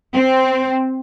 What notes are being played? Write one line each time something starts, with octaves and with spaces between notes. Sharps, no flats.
C4